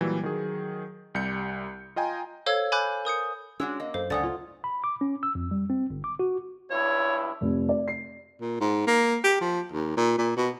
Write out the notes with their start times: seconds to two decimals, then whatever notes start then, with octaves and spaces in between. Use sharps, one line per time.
0.01 A#2 E3 F#3 G3
0.23 D#3 F#3 G#4
1.15 C2 G3 G6 C#7
1.96 F4 D#5 G5 G#5 A#5
2.46 A4 C5 C#5 F5 E6 G#6
2.72 G#5 B5 D6 F#6 G6
3.05 A#4 D#6 G6 C#7
3.60 G#3 C#4 D4 F#4 E6
3.80 A#3 D#5
3.94 F#2 A4 C5 F5
4.10 C#2 F#2 D3 C#4 F#5 D#6 A6
4.23 F4
4.64 B5
4.84 D6
5.01 C#4
5.23 E6
5.35 F2
5.51 G3
5.70 C4
5.90 G1
6.04 D6
6.19 F#4
6.71 C#2 G2 E4 C#5
7.41 F1
7.69 D5
7.88 C7
8.41 A#2
8.60 G#2
8.87 A#3
9.24 G4
9.41 F3
9.72 D#2
9.97 A#2
10.18 A#2
10.37 B2